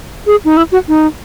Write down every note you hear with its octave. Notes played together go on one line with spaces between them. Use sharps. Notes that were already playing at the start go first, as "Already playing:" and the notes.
G#4
D#4
E4
F#4
D#4